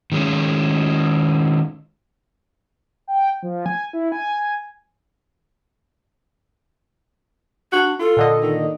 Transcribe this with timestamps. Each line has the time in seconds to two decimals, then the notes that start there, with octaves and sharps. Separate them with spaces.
0.12 D#3 G#3 A#3 C#4
3.07 G5
3.43 F3
3.66 G#5
3.93 E4
4.12 G#5
7.72 D4 F#4
8.00 F4 A4
8.17 A#2 D3 D#5
8.42 D#3